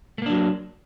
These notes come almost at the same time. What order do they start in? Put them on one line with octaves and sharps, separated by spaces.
A3 A#3 D4 F#3